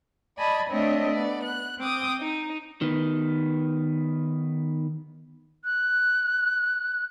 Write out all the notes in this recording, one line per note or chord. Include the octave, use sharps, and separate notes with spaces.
D5 D#5 G#5 A5 B5
A3 C4 D4 C#5 D#5 E5
B3 D5
F#6
C4 G5 D6 D#6
D#4
D#3 B3
F#6